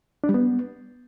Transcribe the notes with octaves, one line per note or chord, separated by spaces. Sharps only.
D4
G3
B3